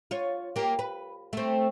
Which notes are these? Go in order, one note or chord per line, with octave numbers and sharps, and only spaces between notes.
F4 C#5
A#3 G4
B4
A3 C4